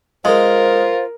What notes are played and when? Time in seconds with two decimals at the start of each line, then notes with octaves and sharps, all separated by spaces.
0.25 G#3 F4 A#4 C5